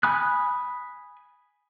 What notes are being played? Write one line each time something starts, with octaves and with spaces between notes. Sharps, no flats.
G#5 B5 D#6 F#6